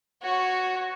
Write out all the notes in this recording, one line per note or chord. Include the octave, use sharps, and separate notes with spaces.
F#4 C#5